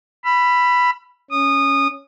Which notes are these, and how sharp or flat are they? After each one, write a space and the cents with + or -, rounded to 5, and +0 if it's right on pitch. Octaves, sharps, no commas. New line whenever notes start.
B5 +0 E6 +45
C#4 +0 D#6 -20